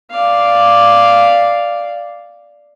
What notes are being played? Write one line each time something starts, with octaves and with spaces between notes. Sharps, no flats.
D5 F5